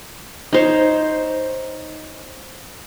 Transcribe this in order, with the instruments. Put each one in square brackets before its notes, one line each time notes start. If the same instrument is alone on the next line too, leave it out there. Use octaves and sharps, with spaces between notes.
[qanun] D#4 C5 C#5